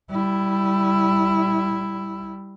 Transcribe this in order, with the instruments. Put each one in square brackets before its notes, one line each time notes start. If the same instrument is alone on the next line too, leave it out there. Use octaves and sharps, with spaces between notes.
[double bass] G3 E4